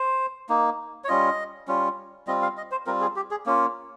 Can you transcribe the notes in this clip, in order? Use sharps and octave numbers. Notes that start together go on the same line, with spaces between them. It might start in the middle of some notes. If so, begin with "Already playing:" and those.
Already playing: C5
A#3 D#4
C#5
G3 C#4 F4 D#5
G3 C#4 F4
G3 C4 F4 D#5
F5
D#5
C5
G3 C4 F4 A#4
G#4
G4
G#4
A#3 C#4 F4